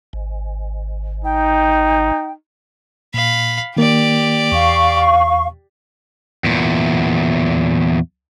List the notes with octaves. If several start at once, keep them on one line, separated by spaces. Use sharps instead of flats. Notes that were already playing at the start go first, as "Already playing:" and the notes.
G#1
D#4 G5
A#2 F5 B5
D#3 A#3 G4 D5
E2 F5 C#6
E2 A#2